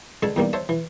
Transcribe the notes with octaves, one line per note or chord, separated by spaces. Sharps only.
C#2 D3 G#3 A4 G#5 A5
E2 D#3 G3 A#3
C5 C#5 E5 A5
E3